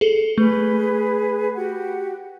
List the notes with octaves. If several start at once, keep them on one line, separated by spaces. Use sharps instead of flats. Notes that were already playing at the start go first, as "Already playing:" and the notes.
G#4 A4
A3 G#4 B4
F#4 G4 F#5